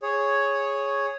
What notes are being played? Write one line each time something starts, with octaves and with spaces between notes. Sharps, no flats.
G#4 C#5